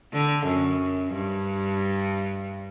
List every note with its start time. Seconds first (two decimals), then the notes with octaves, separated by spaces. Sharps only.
0.13 D3
0.46 F#2
1.14 G2